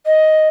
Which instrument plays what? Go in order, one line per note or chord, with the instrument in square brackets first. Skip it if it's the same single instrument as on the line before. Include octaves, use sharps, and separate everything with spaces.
[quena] D#5